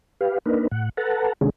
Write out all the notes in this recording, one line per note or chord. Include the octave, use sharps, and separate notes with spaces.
G4 B4 F5
A#3 D4 D#4 A#4 B4
A2 F#5
A4 B4 F#5 A5 A#5
C3 D#3 G#3 C#4 D4 G#4